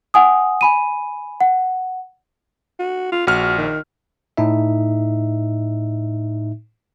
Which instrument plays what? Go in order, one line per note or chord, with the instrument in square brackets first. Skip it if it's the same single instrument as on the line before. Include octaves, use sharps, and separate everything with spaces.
[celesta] F#5 G#5 D#6
G#5 B5 D#7
F#5
[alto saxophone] F#4
F4
[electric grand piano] A#1 F6 [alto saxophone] F#4
[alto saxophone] D#3
[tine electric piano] A2 D#4 E5